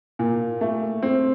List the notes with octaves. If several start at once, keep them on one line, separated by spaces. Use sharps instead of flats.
A#2
A3
C4